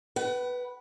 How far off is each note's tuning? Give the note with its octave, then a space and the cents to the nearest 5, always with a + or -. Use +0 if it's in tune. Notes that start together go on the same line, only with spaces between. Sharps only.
B4 +0 F#5 +40